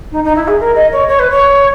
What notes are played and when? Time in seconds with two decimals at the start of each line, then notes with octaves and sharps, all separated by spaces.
0.12 D#4
0.24 D#4
0.36 E4
0.48 G#4
0.60 A#4
0.75 D#5
0.92 C#5
1.08 C#5
1.19 B4
1.30 C#5